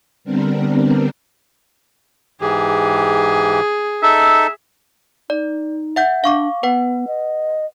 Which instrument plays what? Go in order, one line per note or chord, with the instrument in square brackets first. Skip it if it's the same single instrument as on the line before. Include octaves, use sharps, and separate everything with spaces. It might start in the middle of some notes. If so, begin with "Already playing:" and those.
[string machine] D3 G3 B3 C4 D4 A#4
[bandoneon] G#2 E3 G4 [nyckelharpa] G#4
[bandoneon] D#4 A4 [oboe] E5
[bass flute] D#4 [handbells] D5
[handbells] E5 F#5 G6
[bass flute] D4 [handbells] F5 C#6 D6
[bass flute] B3 [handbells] B4 F#5
[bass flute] D#5